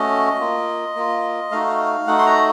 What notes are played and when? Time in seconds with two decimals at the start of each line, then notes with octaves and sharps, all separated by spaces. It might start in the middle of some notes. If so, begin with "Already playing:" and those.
Already playing: A3 C#4 F#4 D#5
0.40 A#3 F4
0.96 A#3 F4
1.51 A3 D#4 F#4 F5
2.07 A3 D#4 F#4 F#5
2.18 C6
2.26 A#5